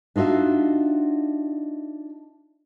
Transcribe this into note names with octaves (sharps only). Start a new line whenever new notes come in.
D4 D#4 F4 F#4 E5